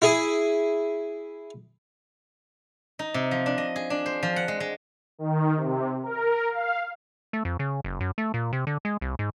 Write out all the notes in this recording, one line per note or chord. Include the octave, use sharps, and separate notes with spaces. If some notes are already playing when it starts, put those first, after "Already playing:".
E4 G#4
D#4
C3
F3
D4
D#5
G#4
D4
C5
F3
F#5
G#3
G#3
D#3
C3
A#4
F5
A3
F2
C#3
F#1
F#2
A3
A#2
C3
D3
G#3
C2
G#2